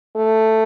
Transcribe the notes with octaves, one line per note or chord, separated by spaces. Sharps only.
A3